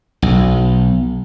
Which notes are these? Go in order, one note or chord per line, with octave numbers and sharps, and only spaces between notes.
B1